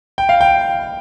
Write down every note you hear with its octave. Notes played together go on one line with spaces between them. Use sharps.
G5
F5
G5